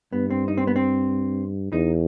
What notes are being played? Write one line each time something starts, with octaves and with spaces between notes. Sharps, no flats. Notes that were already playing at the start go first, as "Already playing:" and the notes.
G2 B3
C4
D#4
C4
B3
C4
E2 D#4